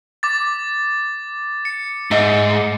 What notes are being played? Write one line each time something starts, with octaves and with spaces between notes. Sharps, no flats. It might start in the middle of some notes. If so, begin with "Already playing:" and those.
D6 A6
C#7
G#2 D#4 E5